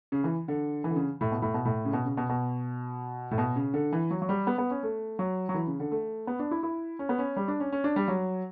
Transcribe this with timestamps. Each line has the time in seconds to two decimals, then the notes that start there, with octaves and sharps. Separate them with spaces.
0.12 C#3
0.24 E3
0.48 D3
0.84 E3
0.90 D3
0.96 C#3
1.21 A2
1.31 B2
1.42 A2
1.54 B2
1.65 A2
1.85 C#3
1.93 B2
2.05 C#3
2.17 B2
2.29 B2
3.31 A2
3.38 B2
3.56 C#3
3.74 D3
3.93 E3
4.11 F#3
4.22 F#3
4.29 G3
4.47 B3
4.58 B3
4.71 C#4
4.83 A3
5.19 F#3
5.49 F#3
5.54 E3
5.67 C#3
5.80 D3
5.92 A3
6.27 B3
6.39 D4
6.51 E4
6.63 E4
6.99 C#4
7.09 B3
7.18 C#4
7.36 G3
7.48 D4
7.60 C#4
7.72 C#4
7.84 D4
7.96 G3
8.08 F#3